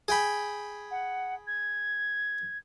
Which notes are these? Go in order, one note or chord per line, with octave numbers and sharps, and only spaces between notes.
G#4 G5 B5
F#5
G#6